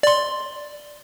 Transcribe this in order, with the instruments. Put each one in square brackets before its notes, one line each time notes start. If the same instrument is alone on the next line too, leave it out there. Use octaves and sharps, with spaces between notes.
[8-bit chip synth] D5 C6